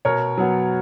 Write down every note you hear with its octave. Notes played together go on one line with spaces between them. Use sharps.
B2 A#4 C#5
F#3 B3